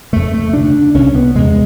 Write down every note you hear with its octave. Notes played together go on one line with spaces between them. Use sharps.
F2 C#3 A3
A3
D2 C#3 D4
C2 C3 C#4
B3
E2 C3 G#3